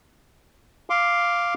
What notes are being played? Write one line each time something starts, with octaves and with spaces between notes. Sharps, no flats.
F5 C6 D6